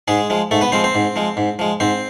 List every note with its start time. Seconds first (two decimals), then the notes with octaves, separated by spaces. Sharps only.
0.08 G#2 G#3 G#4
0.30 F3 G#3
0.51 G#2 A3 A4
0.61 B3 B4
0.72 F3 G#3 C4 C5
0.84 C4 C5
0.95 G#2
1.16 F3 G#3
1.37 G#2
1.59 F3 G#3
1.80 G#2 C4 C5